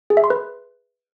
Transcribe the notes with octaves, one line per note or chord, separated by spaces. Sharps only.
G#4
E5
C6
B4